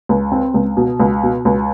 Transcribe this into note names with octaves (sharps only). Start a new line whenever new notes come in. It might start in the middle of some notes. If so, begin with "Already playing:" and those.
C#2
C4
C#2
B2
C#2
B2
C#2